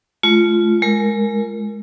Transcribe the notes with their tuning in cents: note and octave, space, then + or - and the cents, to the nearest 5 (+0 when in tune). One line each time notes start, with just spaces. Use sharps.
A3 -40 F4 -15
G#3 +15 A#4 +0